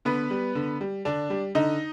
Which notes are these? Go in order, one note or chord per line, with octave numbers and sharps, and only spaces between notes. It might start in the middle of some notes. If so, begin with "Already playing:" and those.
D3 B3 B4
G3
D3
G3
D3 D4 D5
G3
D3 D#4 D#5